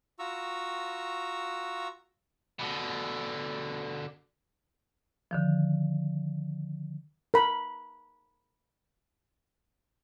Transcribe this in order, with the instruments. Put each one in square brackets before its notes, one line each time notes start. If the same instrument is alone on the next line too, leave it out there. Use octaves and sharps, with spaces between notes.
[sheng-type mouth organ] F4 F#4 A#5 C#6 E6
[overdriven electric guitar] B2 D3
[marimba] D3 D#3 F3
[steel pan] A#4 B5